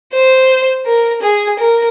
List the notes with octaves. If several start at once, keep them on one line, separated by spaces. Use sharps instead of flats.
C5
A#4
G#4
A#4